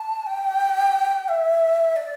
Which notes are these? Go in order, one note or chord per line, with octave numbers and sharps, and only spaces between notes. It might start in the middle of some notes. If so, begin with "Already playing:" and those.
Already playing: A5
G5
E5
D5